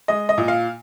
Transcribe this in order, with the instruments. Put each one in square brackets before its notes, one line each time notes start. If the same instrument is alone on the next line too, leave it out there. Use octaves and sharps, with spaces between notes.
[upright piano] G#3 D#5
D#5
A#2
F5